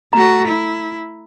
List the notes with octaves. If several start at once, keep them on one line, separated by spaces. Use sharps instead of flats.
A3 F#4 A#5
E4